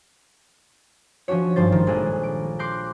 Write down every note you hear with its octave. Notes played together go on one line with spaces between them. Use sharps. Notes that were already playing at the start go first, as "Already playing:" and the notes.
F3 C#4 D4 F#4 C#5
G#1 G2 F3 C5 A6
D#3
A#1 G#3 G#4 A4 F#6
D7
C6 D6 F#6 G6 A#6